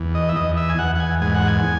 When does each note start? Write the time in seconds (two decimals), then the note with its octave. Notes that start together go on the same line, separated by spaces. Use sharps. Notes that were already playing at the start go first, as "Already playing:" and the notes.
Already playing: E2
0.15 D#5
0.29 E5
0.36 E2 D#5
0.57 E5
0.70 G#5
0.79 E2 F#5
0.95 F#5
1.00 G#5
1.21 G#2 G#5
1.35 F#5
1.48 G#5